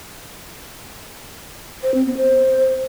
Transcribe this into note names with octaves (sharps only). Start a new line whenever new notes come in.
C5
C4
B3
C5